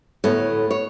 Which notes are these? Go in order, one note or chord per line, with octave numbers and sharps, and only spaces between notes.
D2 A2 B3 A4 C#5
C#5